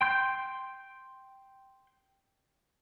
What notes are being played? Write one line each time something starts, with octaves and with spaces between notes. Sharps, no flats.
G5 C6 G6